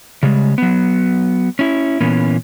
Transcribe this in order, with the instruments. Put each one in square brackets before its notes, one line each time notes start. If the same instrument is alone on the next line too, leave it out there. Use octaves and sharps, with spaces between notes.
[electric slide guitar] C#3 G3 G#3
F#3 B3
C#4 E4
A#2 E3 A#3 B3 C#4